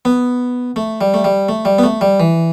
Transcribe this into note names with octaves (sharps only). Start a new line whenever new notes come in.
B3
A3
G3
A3
G3
A3
G3
B3
A3
G3
E3